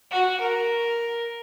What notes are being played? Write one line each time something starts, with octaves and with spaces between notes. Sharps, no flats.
F#4
A#4